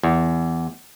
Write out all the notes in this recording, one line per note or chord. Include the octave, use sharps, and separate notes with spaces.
E2